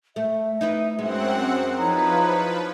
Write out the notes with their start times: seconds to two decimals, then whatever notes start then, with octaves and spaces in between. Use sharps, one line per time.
0.16 A3 E5
0.61 D#4 E4 B4
0.99 F#2 G#3 C4 F#5
1.78 F3 D#4 E4 B4 C#5 A#5